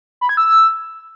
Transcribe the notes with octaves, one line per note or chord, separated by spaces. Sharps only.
B5
G#6
E6